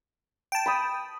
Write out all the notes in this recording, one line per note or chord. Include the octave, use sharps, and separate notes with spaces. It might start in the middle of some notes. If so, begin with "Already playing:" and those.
G5 A5
B5 D#6